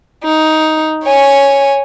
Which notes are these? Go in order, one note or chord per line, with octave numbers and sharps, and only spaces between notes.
D#4
C#5 G#5